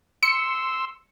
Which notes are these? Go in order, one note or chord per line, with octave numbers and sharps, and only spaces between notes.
C6 E6 C#7